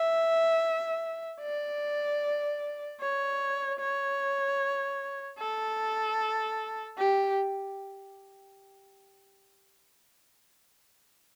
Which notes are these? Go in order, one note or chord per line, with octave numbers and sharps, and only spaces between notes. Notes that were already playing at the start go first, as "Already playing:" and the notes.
Already playing: E5
D5
C#5
C#5
A4
G4